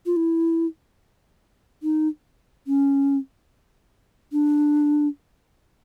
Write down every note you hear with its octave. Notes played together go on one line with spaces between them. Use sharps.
F4
E4
D#4
C#4
D4